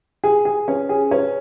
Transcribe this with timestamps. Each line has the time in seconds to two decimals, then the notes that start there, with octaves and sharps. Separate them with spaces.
0.24 G#4
0.45 G#4
0.68 C#4
0.89 G#4
1.11 C#4